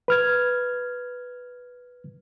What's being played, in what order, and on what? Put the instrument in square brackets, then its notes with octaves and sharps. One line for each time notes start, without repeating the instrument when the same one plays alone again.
[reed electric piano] B4 F6 G#6